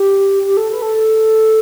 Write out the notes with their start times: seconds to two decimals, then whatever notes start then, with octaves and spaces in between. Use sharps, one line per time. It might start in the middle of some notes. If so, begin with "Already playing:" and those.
Already playing: G4
0.45 G4
0.57 A4
0.72 B4
0.82 A4